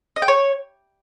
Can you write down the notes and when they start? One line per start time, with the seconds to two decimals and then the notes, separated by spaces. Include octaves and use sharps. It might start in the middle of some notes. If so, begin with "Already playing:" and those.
0.16 D#5
0.22 G5
0.28 C#5